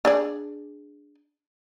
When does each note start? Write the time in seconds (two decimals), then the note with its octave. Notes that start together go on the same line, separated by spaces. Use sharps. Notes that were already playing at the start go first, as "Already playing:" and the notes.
0.05 D4 G#4 D5